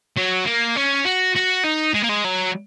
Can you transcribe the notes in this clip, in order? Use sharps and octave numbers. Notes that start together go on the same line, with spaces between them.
F#3
A#3
C#4
F#4
F#4
D#4
G#3
A#3
G#3
F#3